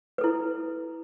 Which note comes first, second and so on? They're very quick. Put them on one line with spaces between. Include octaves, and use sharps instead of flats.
B4 A4 E4